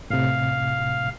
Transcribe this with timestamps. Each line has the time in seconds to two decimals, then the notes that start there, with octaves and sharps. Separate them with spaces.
0.10 A2 C3 F5